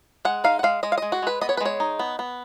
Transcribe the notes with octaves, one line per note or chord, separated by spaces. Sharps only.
G#3 F#5
D#4 F5
F#5
G#3 F5
G#3 D#5
F5
G#3 D#5
F#4
G#3 B4
B3 D#5
C#5
B4
G#3 C#5
D#4
B3
B3